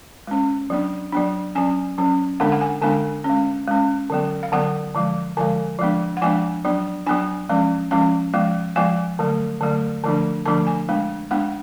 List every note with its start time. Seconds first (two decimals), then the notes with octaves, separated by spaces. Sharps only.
0.27 G#3 C#4
0.70 F#3 B3 D4
1.12 F#3 B3 D4
1.55 F#3 C#4 G#5
1.98 F#3 C#4
2.40 D3 G#3 B3 D4 F#5
2.52 F#5
2.61 G#5
2.82 D3 G#3 B3 D4 G#5
3.24 C#4
3.29 G#3
3.67 G#3 C#4
4.10 D3 F#3 B3
4.43 F5
4.52 D3 F#3 B3 F#5
4.94 D3 F3 G#3
5.37 D3 F3 G#3 G#5
5.79 F3 G#3 B3 D4
6.17 F#5
6.22 F3 G#3 B3 D4 G#5
6.65 F#3 B3 D4
7.06 F#3 B3 D4 G#5
7.49 F3 G#3 C#4
7.91 F3 G#3 C#4 A5
8.33 F3 G#3 B3
8.76 F3 G#3 B3 G#5
9.19 D3 F#3 A3
9.61 D3 F#3 A3
10.04 D3 F3 A3 D4
10.45 D3 F3 A3 D4 A5
10.67 G#5
10.89 G#3 B3 D4
11.31 G#3 B3 D4 F#5